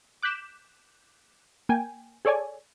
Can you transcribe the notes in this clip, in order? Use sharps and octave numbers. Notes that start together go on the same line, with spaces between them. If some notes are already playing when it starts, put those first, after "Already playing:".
D6 F#6 G6 B6 E7
A#3 G5 G#5
G#4 A4 C#5 D5 G#5